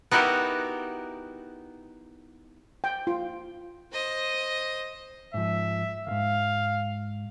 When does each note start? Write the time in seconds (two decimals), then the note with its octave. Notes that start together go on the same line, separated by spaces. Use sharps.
0.11 B3 D#4 E4 F#4 G4 A#4
2.84 G5
3.07 F4
3.92 C5 D#5
5.34 G#2 F3 E5
6.07 D#2 G#2 F5